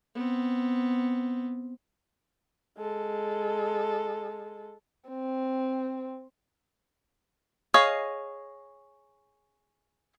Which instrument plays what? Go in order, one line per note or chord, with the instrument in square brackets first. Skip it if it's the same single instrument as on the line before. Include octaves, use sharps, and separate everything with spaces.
[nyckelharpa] B3 C4
[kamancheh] G#3 A4
[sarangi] C4
[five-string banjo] G#4 C#5 D#5 F5